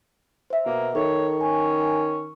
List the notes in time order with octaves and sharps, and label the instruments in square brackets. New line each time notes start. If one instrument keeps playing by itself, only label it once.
[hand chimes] C5 E5
[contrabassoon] B2 [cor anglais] A#3
[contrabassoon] D#3 [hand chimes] A4 [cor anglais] C#5
[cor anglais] C#4 [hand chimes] G#5